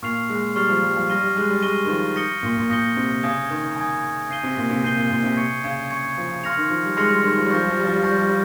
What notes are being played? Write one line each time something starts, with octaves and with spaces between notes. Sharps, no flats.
A#2 C#6 F6 C7 F7
G#3
G3 C#6 F6 C7 F7
F3
G3
F3
G3 C#6 F6 A#6 D#7 G7
G3
G#3
G3
G#3 C#6 F6 A#6 D#7 G7
D#3
F3
D#6 G6 A#6 C#7 G7
A#2
A#2
A#2 D#6 G6 A#6 C#7 G7
C3
C#3 G#5 D#6 G#6
D#3
G#5 D#6 G#6
C#3 G6 C7 D#7 G7
C3
A#2
C3
C3 G6 C7 D#7 G7
A#2
A#2
C3
C#6 G#6 C#7
C#3
C#6 G#6 C#7
F3
C#3 C6 F6 A#6 C#7 F7
D#3
F3
G3
G#3 C6 F6 A#6 C#7 F7
G3
D#3
F3
G3
F3 C#6 G6 A#6
G3
F3
G3
F3
G3
F3 C#6 G6 A#6
G3
F3
G3